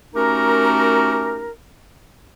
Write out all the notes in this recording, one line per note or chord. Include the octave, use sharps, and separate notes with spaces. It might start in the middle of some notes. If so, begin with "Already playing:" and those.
A3 C#4 D#4 F#4 G4 A#4